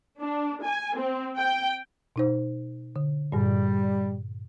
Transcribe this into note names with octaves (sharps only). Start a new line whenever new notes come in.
D4
G#5
C4
G5
B2 D#4 C5
D3
G2 A#2 G3